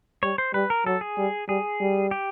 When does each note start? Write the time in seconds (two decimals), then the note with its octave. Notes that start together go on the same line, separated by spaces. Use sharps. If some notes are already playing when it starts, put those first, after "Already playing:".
0.23 G3 C#5
0.38 C5
0.54 G3 B4
0.70 A#4
0.86 F#3 A4
1.01 G#4
1.18 G3
1.48 G3 G#4
1.80 G3
2.11 G4